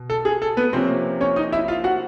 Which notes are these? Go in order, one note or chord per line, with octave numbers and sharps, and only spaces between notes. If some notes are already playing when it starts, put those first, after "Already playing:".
Already playing: B2
A4
G#4
A4
B3 B4
C3 F3 A#3 C4 C#4 C5
C#4 C#5
D#4 D#5
E4 E5
F4 F5
F#4 F#5